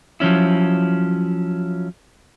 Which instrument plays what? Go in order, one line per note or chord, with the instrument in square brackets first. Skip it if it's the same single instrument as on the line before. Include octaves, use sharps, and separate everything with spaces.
[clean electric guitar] F3 F#3 C#4 E4